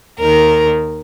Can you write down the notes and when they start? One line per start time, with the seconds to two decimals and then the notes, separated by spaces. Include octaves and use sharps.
0.19 D#2 D#3 A#4